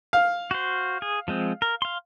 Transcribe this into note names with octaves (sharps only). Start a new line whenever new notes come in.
F5
F#4 C5
G#4
F3 G#3 C4
A#4
F5 C6